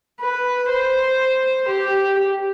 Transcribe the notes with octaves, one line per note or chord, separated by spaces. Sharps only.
B4
C5
G4